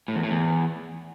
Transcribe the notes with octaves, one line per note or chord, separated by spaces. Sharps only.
A2
E2
A2
E2